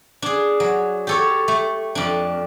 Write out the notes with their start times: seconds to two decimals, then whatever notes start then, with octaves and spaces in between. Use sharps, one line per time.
0.22 D4 G#4
0.60 F#3
1.07 G4 A4 C#5
1.48 A3
1.95 F2 D4